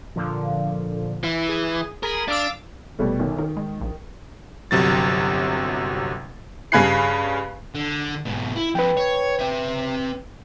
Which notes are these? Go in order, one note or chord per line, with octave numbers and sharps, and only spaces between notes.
A#2 D3 F3
E3 E4
G#4
G#4 A#4 B5
D4 F5 D6 E6
F1 B2 G3 A3
B1 D#3
D#3 A#4
G#3
A#1
G1 C3 F#3 A6
G2 C#3 G#5 B5 F#6 C7
D3
G#2 B2
E4
F2 B4 G5
C#5
C4 E5